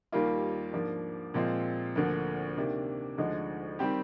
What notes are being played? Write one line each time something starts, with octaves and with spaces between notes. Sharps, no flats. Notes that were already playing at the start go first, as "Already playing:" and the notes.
D#2 D#3 G3 A#3 F4
G#2 F3 A#3 D4
A#2 F3 G#3 C4 F4
D2 D3 F3 A#3
C3 D#3 A#3 D4
D2 D3 F3 G#3 D#4
D#3 G3 C4 G4